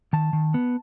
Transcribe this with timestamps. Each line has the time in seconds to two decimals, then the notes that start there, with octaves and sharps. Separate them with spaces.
0.13 D#3 A5
0.33 D#3
0.54 B3